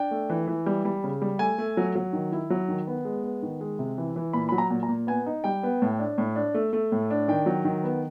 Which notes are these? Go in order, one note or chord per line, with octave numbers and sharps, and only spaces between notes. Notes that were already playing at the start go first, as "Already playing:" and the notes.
Already playing: D4 G5
A3
E3
E3
G3
G3
C#3
G3
A3 G#5
A3
F#3
F#3
D#3
E4
F#3
D#3
B3
G#3
B3
D#3
G#3
C3
E3
E3
A#2 B5
F#3 B5
A#5
A#2
A#5
A#2
B3 G#5
D#4
G3 G5
B3
A2
D4
A2
D4
A3
A3
A2
D4
D#3 G5
F#3
D#3
B3